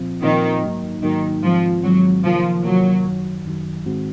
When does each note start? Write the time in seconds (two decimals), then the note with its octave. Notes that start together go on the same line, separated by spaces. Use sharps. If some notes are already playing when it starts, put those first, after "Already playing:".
Already playing: A#2 F3 C4 F4
0.22 A#2 D#3 F3 C4 F4
0.62 G#2 F#3 A#3 D#4
1.02 G#2 D#3 F#3 A#3 D#4
1.43 G#2 D#3 F3 G#3 C4
1.83 G#2 D#3 F#3 G#3 C4
2.24 C3 D#3 F3 A#3 F4 A#4
2.64 C3 D#3 F#3 A#3 F4 A#4
3.05 F#2 D#3 F#3
3.46 F#2 D#3 F#3
3.86 G#2 D#3 G#3 C4 F#4